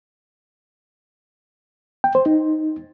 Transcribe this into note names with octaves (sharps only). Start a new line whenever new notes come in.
G5
C5
D#4